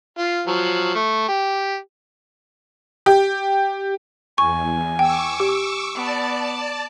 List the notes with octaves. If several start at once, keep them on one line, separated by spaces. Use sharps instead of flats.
F4
F3 F#3
A3
G4
G4
E2 G#5 C#6
G5 C#6 D6 E6
G4
B3 D5 A5